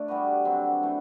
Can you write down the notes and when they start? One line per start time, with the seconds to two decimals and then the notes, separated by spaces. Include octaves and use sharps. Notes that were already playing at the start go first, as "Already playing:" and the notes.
Already playing: A3 D4
0.08 G3 B3 F#4 B4
0.45 D3 F#3 C4
0.83 E3 A3